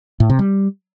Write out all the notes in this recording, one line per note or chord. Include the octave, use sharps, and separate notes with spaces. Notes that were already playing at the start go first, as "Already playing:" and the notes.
A2
C3
G3